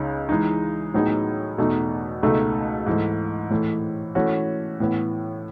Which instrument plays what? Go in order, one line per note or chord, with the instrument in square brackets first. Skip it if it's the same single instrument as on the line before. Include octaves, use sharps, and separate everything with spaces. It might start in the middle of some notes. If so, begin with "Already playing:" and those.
Already playing: [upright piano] C#2 C#3 D#4 G#4
E3 G#3 D#4
A2 F#3 B3 D#4 G#4
E2 B2 A3 D#4
C#2 B2 A3 D#4 A4
G#2 E3 A3
A2 E3 A3
E3 A3 C#4 F#4
A2 E3 B3